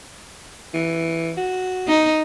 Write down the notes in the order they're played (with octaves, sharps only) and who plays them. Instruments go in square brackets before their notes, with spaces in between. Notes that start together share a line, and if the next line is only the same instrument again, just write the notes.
[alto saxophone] E3
F#4
[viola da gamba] D#4